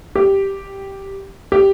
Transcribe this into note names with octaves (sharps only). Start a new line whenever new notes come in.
G4
G4